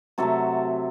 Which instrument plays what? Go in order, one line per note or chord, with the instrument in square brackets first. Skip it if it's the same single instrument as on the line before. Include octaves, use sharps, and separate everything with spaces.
[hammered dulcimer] C3 F#3 A3 F#4 A4